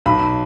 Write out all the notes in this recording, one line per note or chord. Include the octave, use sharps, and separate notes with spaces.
B1 B5